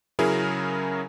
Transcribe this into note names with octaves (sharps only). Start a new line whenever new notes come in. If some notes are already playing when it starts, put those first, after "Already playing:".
C#3 F#3 C#4 E4 G#4 A#4